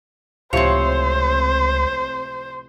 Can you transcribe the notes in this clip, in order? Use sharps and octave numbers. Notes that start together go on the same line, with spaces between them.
C#2 A2 C3 F3 C4 C5 C#5